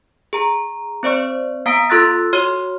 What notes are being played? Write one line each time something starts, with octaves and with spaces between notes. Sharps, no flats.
G#4 A#5
C4 C5 D5 C#6
B3 F5 A#5 D#6 B6 D7
F4 A4 C6 E6 F#6 A6
F#4 C#5 C6 F6